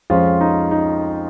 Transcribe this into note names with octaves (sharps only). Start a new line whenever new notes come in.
F2 F3 G#3 C#4 F4
D#4
D#4